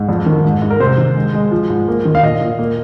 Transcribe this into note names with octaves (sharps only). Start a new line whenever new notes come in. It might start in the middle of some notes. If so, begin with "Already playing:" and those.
Already playing: G#2
F2
D#3
G#2
G#2
A#4
C3 C5
D#3
G#3
G#3
F3
G#2
A#3
D#3
F5
A#2 D#5
A#2
A#3